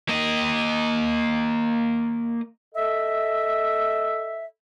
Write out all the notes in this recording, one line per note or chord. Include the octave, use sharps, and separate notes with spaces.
A#3 D#5
A4 D#5 E5